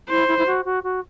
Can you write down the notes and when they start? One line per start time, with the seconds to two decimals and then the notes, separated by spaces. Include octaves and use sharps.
0.09 E4 C5
0.27 E4
0.38 E4
0.46 F#4
0.64 F#4
0.83 F#4